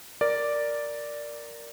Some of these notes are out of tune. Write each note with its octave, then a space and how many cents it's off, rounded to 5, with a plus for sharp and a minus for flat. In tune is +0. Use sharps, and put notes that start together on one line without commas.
A#4 +0 D5 +0